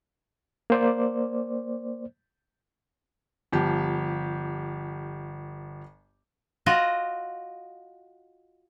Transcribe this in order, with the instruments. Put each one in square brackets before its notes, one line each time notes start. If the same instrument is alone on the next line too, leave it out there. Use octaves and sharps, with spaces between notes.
[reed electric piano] A#3 C5 D5
[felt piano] G1 F3 G4
[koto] F4 F#4 D#5